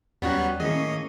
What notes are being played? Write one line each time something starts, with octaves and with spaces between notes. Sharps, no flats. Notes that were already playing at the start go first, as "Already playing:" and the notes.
D#2 F#3 G3 B3 C#4 F#4
A2 D#3 A#3 C#4 G#4 D#5